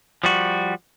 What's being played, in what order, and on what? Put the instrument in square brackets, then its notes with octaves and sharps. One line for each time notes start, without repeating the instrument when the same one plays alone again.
[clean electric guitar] F3 G3 F#4